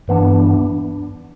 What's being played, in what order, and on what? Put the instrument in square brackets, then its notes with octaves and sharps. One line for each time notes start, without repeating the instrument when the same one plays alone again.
[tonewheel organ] G2 E3 B3 D4